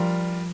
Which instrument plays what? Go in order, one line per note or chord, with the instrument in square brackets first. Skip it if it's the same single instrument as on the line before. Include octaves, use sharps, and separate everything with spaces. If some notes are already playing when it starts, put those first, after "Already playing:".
Already playing: [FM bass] F3 [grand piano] G3 D4 F4 A#4